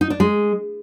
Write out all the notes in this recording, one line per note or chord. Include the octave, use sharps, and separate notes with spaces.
D#4
D4
G#3